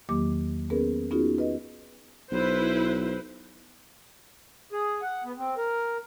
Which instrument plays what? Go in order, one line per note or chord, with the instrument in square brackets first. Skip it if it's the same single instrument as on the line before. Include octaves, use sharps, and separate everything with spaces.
[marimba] E2 D#3 F#3 A#3 G4 D6
B3 C#4 G#4 A#4 B4
B3 C#4 D#4 F4 F#4 G#4
B4 D#5
[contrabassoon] B1 [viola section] E4 B4 C5
[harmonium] G#4
F#5
B3
C4
A#4